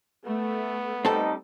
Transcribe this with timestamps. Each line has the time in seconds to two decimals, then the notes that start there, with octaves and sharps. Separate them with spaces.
0.25 A3 B3
1.05 G3 C4 D#4 A4